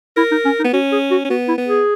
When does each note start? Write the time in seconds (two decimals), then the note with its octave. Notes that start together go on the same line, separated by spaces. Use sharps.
0.17 E4 A#4
0.31 D#4
0.45 C#4
0.59 D#4
0.64 B3
0.73 C#4 F#4
0.92 G#4
1.11 F#4
1.25 C#4
1.30 B3 F#4
1.48 E4
1.58 B3
1.67 G#4